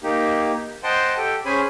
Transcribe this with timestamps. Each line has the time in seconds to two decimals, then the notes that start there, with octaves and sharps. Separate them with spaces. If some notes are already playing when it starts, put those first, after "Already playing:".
0.03 A#3 D#4 G4
0.84 C5 D#5 F#5 G5 A5 C6
1.18 G4 A4 G5
1.45 C#4 G#4 C5 G#5 B5